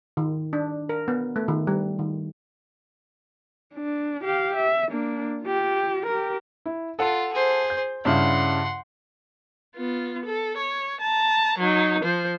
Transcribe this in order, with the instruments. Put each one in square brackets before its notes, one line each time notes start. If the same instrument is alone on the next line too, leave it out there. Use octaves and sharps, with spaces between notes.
[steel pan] D#3
D4
A#4
B3
A3
D#3
G3
D#3
[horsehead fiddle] D4
G4 F5
E5
A#3 D4
F4 G4
G4 A#4
[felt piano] E4
[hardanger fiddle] F4 [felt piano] A4 F#5
[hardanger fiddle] G#4 C5
[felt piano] G6
[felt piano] G2 C#3 E4 [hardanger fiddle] F#5 C6
[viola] B3 F4
A4
C#5
A5 A#5
F#3 D#4
F3 C5